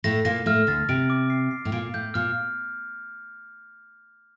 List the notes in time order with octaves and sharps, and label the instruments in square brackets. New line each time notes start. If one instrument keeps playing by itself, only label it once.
[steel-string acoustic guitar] A2 A3 [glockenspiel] A#6
[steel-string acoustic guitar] A#2 A#3 [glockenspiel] A#6
[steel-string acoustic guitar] A2 A3 [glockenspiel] F6
[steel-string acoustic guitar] D2 D3 [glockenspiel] A6
[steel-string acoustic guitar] C3 [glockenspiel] D7
[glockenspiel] D6
C7
C7
[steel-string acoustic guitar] A2
[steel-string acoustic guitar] A#2 [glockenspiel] D7
[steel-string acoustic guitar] A2 [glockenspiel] G6
[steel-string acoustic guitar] A#2 [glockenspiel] F6